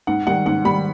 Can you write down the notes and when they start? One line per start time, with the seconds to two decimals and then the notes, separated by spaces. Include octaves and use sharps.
0.07 G#2 F#5
0.27 D#3 G3 F#5
0.46 G#2 F#5
0.65 D#3 G3 B5